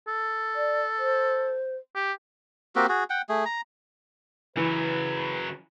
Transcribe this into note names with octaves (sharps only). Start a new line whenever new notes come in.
A4
D5
C5
G4
A#3 C4 F#4 G4
F#4 G#4
F#5 G5
A3 G#4
A#5
C#3 E3 F#3 B4